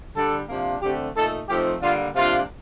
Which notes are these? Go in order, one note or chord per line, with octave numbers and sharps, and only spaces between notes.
D3 G3 D4 A4
C3 F3 A#3 D4
D3 A3 C4 G4
A#2 A3 D#4 A4
F3 A3 C4 D#4 G4
D3 G3 A#3 F4
C3 F3 A#3 D4 F4